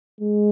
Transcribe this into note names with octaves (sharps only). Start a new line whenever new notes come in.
G#3